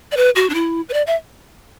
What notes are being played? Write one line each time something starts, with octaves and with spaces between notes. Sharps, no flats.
D5
B4
F#4
D4
E4
B4
D5
E5